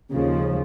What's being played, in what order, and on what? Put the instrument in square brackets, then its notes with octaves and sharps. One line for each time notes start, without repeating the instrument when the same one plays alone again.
[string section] D#2 C#3 F3